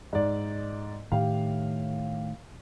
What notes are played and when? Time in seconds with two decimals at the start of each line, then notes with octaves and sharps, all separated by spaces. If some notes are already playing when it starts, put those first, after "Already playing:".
0.13 G#2 D5
1.12 A2 D#3 G4 F5